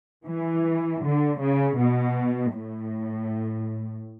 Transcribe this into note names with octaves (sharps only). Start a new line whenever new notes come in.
E3
D3
C#3
B2
A2